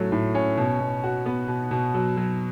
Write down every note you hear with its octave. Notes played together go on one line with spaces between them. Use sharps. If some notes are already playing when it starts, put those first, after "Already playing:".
Already playing: A2 F#3 A3 C#4
A2
C#4
B2
B2
F#4
B3
B2
B2
F#3
F#3